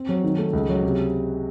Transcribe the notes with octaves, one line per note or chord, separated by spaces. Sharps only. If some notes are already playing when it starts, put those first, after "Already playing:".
Already playing: C4
F#3
D#3
A3
C#2
F#3
C3